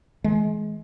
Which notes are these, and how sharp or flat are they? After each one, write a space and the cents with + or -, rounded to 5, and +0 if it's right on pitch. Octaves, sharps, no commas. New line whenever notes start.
E3 -20 G#3 +25